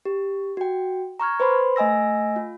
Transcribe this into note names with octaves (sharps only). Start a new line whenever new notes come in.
G4
F#4 G5
A#5 C#6 F6 G#6
B4 C5 B5 C6
A3 D#5 G#5 E6 A#6
F4